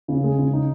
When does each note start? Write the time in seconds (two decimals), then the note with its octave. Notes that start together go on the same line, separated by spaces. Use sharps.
0.08 C#3
0.24 G#3
0.39 C#3
0.53 D#4